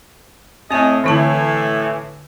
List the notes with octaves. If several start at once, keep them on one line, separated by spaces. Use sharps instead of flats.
A2 C4 D#5 G#5
A2 D3 E3 E4 A5